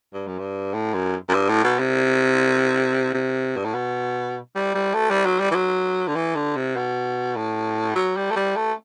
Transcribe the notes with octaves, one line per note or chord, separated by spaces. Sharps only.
G2
F#2
G2
A2
F#2
F#2
G2
A2
B2
C3
C3
G2
A2
B2
G3
G3
A3
G3
F#3
G3
E3
F#3
D3
E3
D3
C3
B2
A2
F#3
G3
A3
G3
A3